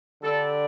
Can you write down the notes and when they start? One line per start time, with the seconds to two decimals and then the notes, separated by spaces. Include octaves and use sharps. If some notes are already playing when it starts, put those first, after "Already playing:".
0.22 D3 G3 D4 A4